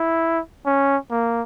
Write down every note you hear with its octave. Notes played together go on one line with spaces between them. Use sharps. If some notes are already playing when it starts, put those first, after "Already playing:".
Already playing: E4
C#4
A#3